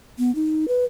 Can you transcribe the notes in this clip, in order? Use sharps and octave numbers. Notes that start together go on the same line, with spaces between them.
B3
D#4
B4